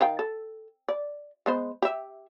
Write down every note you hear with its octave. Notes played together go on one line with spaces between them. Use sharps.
D#3 F5 G5
A4
D5
G#3 B3 C5
G4 E5